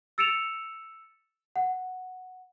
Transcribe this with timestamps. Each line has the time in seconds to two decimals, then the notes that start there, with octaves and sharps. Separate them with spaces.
0.18 E6 A6 C#7 D7 E7 F7
1.56 F#5